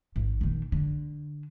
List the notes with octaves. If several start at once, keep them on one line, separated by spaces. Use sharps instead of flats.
G#1
A#2 D#3
D3